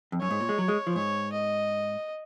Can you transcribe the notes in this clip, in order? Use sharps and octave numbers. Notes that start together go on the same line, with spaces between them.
F2
F#2 C#5
G#2
A#2
G#3
F#3
G#3
F3
G#2 C#5
D#5